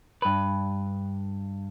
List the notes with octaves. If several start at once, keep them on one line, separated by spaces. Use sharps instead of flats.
G2 B4